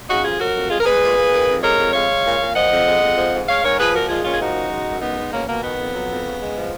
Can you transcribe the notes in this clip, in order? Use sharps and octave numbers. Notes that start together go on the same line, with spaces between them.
C#3 D#4 F#4
F2 F4 G#4
F#3 F#4 A#4
F2
G#3 F4 G#4
A#4
G#3 G#4 B4
A#2
A#2
D#3
F2
G#3 A#4 C#5
F2
G#3 C#5 F5
G#3
A#2
A#2
F3 D#5 F#5
F2
G#3
F2
F3
G#2
G#3 C#5 F5
G#2 A#4 C#5
F3 G#4 B4
A#2 F#4 A#4
G#3 F4 G#4
A#2 C#4 F4
G#4
F3 D#4 F#4
F#2
G#3
F#2
G#3 B3 D#4
G#3
B2 A#3 C#4
B2 A#3
D#3 B3
F2
F#3
F2
C#3
G#3
F3